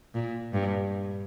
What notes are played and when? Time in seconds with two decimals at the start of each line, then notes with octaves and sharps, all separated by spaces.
0.14 A#2
0.54 G2